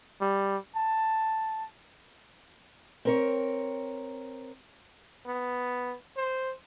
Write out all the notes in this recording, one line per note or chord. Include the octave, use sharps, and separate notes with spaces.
G3
A5
C4 A#4 C#5
B3
C5